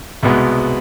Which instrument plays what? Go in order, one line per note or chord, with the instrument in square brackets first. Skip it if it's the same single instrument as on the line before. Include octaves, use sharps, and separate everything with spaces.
[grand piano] C2 B2 G#3 B3